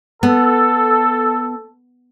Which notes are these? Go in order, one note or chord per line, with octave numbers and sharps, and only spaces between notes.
B3 A4